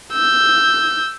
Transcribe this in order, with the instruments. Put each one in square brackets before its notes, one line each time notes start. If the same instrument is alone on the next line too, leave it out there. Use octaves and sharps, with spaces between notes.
[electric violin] E6 G6